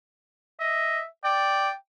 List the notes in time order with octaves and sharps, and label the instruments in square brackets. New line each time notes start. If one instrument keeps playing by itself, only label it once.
[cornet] D#5 [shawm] E5
[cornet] D5 [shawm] G5